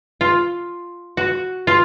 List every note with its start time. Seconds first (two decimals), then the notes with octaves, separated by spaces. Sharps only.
0.21 F4
1.17 F#4
1.67 F4